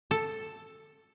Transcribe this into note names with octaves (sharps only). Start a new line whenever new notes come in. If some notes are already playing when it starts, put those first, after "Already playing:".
A4